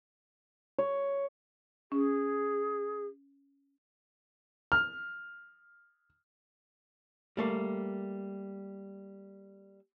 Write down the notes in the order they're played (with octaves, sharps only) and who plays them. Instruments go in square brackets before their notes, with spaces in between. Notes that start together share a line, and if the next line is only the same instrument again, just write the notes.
[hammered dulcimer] C#5
[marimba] C#4 [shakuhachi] G#4
[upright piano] F6
[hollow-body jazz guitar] G3 A3 A#3